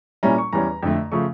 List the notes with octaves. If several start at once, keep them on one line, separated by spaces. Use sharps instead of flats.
A#2 G3 C#4 E4 A#5
C#6
E2 E3 G3 C#4 A#5
F2 D3 A3
C#3 F3 A3 C#6